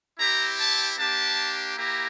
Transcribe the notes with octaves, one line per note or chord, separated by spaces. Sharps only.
C4 E4 G4 A#5
A5
A#3 D4 G4 A5
A#3 E4 G4 A#5